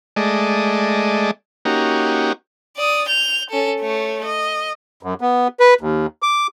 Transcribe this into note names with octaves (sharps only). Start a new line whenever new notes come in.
G#3 A3 D5 D#5
A#3 C#4 D#4 F#4 G4
D5 D#6
G6 F7
C#4 A4
A3 C#5
D#5
F#2
B3
B4
D#2
D6